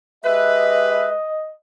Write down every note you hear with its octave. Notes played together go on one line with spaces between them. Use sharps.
G#3 G4 B4 D#5 E5